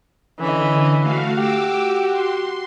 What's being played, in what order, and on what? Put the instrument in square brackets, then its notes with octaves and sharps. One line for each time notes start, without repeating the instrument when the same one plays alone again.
[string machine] D3 [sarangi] E3 [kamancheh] C#4 D#5
[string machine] A3 F#4 F5
[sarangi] F#4 [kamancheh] G4 [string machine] D6 E6
[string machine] C6